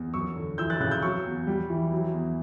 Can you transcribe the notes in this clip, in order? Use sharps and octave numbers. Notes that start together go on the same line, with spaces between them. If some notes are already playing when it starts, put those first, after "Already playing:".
Already playing: E2
F#2 C#6 E6
D3
E3 E6 G6
F#6 A6
C#3 F#6 A6
E6 G6
F#3 C#6 E6
E2
G3
E3
F#3
E2